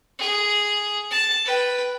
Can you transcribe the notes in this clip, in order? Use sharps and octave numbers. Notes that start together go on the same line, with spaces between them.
G#4
A5
B4 G5